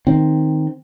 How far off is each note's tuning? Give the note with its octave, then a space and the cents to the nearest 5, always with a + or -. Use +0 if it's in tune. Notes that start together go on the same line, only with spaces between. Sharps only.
D#3 +0 C4 +0